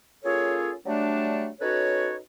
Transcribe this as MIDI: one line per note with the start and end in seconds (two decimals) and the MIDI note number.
0.24 0.72 58
0.24 0.72 61
0.24 0.72 65
0.24 0.72 68
0.24 0.72 69
0.24 0.72 73
0.84 1.47 54
0.84 1.47 55
0.84 1.47 57
0.84 1.47 62
1.60 2.17 61
1.60 2.17 63
1.60 2.17 66
1.60 2.17 69
1.60 2.17 71
1.60 2.17 73